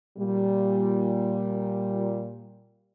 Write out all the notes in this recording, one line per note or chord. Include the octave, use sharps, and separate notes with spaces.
A#2 G3